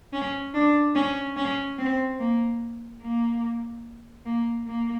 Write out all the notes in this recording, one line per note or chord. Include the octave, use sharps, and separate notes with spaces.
C#4
D4
C#4
C#4
C4
A#3
A#3
A#3
A#3